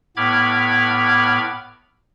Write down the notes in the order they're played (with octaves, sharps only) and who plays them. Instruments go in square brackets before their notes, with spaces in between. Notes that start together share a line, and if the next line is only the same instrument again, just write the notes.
[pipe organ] A2 B3 B5 D6 F6 G#6